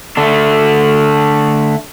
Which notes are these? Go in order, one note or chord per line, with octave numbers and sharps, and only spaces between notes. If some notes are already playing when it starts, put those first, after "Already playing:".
D3 A3 D4